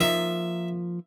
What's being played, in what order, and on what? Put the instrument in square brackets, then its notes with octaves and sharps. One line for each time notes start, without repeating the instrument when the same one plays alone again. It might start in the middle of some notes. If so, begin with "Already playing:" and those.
[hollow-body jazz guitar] F3 A#3 D#4 [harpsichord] E5